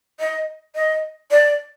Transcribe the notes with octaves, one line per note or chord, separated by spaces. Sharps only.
D#5
D#5
D5